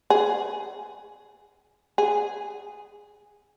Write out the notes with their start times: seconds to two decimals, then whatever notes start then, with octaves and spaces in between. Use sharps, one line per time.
0.10 G#4
1.98 G#4